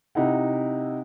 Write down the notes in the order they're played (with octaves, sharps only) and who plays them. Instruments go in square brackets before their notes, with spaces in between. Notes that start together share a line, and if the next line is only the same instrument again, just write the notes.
[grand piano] C3 D#4 E4 F#5